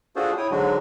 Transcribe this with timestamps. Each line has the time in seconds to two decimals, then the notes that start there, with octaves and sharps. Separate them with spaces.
0.16 D4 F4 F#4 G#4 A4 C5
0.37 E4 C#5 G5 D#6
0.51 G#2 D3 F#3 G#3 D4 F#4